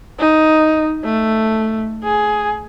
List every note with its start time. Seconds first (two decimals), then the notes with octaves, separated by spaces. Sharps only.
0.19 D#4
1.05 A3
2.04 G#4